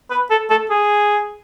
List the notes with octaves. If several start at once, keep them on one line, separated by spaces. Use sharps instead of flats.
B4
A4
A4
G#4